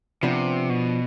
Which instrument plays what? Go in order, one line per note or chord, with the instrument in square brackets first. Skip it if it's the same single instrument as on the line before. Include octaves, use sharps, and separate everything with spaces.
[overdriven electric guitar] C3 [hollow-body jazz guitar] F3 B3 D4
[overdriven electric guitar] B2